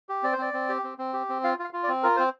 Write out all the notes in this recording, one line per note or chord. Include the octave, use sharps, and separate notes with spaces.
G4
C4 D5
C5
C4 D5
C4
G4
C4
C4
G4
C4
F4 F5
F4
F5
F4
D5
C4
F4 A#4
C4 C5